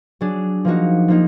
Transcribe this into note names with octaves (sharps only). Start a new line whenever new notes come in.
F#3 D4 G#4
F3 A#3 D#4 F#4
F3 A#3 D#4